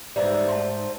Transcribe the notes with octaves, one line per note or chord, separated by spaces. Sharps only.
G#2 E3 G3 C5 D5 E5 A#5
G#2 A5 C6